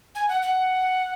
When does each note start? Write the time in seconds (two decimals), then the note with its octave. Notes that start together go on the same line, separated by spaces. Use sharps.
0.15 G#5
0.29 F#5
0.42 F#5